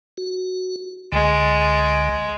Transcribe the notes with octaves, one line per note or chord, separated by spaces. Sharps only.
F#4
C#2 D3 G#3